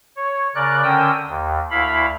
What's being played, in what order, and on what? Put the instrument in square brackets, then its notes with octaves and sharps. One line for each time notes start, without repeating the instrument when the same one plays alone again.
[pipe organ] C#5
C#3 A#4 D5 F#6
D3 C#4 A#4 G5 D#6 E6
D#2
D2 E4 F5 B5